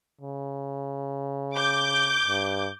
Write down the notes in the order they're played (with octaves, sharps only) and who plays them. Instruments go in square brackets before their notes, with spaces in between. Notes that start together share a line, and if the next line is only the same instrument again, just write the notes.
[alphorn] C#3
[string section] D6 G6
[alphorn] G2